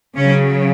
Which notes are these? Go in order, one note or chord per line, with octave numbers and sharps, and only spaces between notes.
C#3 F#3 C#4